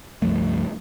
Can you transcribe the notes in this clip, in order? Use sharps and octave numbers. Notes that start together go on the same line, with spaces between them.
C#2 G2 F3 A3